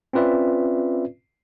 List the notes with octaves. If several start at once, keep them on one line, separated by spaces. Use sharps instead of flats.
C4 C#4 F4 B4 D5 E5